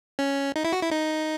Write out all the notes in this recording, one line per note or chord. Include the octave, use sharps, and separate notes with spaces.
C#4
D#4
E4
F#4
E4
D#4